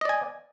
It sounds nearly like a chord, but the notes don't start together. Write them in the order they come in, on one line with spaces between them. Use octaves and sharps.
D#5 D5 G#5